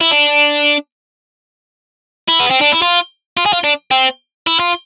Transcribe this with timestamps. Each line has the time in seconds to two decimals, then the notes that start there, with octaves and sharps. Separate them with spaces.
0.01 E4
0.11 D4
2.29 E4
2.40 B3
2.51 C4
2.61 D4
2.73 E4
2.82 F4
3.37 F4
3.46 G#4
3.53 F4
3.64 D4
3.91 C4
4.47 E4
4.59 F4